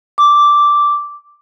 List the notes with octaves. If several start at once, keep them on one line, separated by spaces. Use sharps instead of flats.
D6